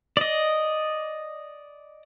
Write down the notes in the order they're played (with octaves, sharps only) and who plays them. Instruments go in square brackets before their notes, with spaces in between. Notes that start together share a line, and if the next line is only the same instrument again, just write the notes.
[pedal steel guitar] D5 D#5